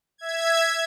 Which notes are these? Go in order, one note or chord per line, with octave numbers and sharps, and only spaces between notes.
E5 G#6